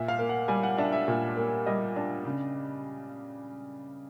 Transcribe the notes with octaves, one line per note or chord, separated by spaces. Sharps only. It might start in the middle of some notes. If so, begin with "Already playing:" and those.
Already playing: A#2 E5
F5
A#3
F#5
G3 G#5
F#5
D4 E5
E5
A#2
A#3
G3 D#5
D4
C#3